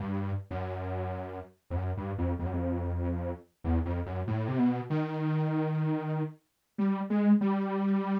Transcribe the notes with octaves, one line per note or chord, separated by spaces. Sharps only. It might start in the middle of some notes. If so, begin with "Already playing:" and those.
Already playing: G2
F#2
F2
F#2
G2
F2
F2
F#2
F2
E2
F2
F#2
A2
C3
B2
D#3
G3
G#3
G3